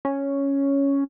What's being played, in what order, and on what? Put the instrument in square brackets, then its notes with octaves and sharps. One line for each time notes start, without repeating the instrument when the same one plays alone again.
[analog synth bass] C#4